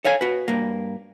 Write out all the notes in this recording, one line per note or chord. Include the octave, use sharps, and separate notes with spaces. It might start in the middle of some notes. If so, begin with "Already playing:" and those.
A4 C#5 F5 G#5
F#4 B4
G2 A#3